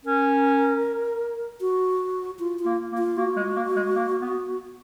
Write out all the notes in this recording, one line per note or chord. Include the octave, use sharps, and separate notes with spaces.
C#4 A#4
F#4
F4
F4
A#3
A#3
F4
A#3 F#4
G#3
A#3
G#3
A#3
B3